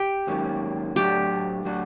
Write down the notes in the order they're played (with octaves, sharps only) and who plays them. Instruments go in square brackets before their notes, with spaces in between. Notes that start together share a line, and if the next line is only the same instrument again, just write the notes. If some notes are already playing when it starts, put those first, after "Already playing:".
Already playing: [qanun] G4
[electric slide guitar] G#2 D#3 F#3 A#3 C#4
[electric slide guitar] A2 F#3 A3 D4 F#4 [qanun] G4
[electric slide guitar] A2 F#3 A3 D4 F#4